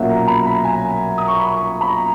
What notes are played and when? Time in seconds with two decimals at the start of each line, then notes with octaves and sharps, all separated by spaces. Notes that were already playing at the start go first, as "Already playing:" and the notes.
Already playing: B1 A#2 F#3 A#3 C#4 E5 F#5
0.10 A#5
0.27 B5
0.46 B5
0.54 A#5
0.65 G#5
0.74 A#5
1.18 D#6
1.28 C#6
1.39 B5
1.50 C#6
1.81 B5
1.89 A#5